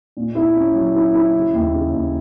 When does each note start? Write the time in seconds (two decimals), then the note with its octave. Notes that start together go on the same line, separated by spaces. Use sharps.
0.17 A#2
0.35 E4
0.56 C#4
0.75 F#3
0.95 E4
1.14 E4
1.34 C#3
1.53 D#2
1.74 C#3
1.92 D#2